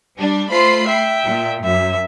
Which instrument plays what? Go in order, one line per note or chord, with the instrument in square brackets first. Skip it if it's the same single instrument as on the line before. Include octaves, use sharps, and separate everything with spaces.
[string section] G3 D4
[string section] A3 B5 C7 [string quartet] F4 C5
[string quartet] E5 G5
[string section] A#2
[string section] F#2 [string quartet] E5